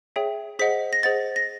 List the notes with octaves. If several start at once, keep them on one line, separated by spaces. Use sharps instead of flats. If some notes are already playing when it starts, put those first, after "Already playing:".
G#4 C#5 E5 G5
G#4 C5 D#5 F#5 B6
A#6
G#4 C5 D#5 F#5 A6
A#6